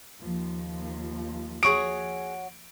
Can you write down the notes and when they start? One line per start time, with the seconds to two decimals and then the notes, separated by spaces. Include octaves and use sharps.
0.20 D#2 F3
1.63 F#4 G#4 C#5 F#5 C#6 D#6 D7